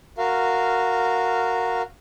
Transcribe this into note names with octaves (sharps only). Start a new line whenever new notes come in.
F#4 A#4 F5